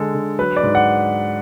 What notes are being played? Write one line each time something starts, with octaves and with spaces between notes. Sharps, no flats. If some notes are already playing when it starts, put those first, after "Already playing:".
Already playing: D3 G#3 A4
D3
F#3 B4
D5
G#2
F#5